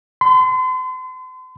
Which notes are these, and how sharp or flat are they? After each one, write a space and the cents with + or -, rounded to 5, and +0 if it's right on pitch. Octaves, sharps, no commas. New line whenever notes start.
C6 -40